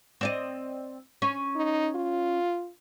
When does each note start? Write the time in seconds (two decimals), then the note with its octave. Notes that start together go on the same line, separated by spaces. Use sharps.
0.21 C4 D5 D#5
1.22 C#4
1.56 D#4
1.95 F4